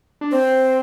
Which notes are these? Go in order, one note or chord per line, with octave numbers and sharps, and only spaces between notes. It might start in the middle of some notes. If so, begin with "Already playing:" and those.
D4
C4 C5